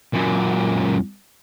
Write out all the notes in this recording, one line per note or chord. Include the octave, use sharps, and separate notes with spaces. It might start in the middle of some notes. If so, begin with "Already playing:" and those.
F#2 A#2